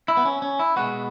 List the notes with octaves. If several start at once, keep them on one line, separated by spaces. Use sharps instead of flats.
E4
B3
C#4
C#4
E4
B2 G#3 B3 F#4